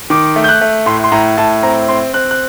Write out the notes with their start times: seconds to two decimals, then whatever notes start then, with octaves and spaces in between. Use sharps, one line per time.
0.10 D#3 D6
0.36 A3
0.44 G6
0.49 F#6
0.61 A3
0.86 A2 C6
1.04 C6
1.12 A2 A#5
1.38 A2 A5
1.63 C4 A#5
1.89 C4 C6
2.13 C4 F#6
2.31 F#6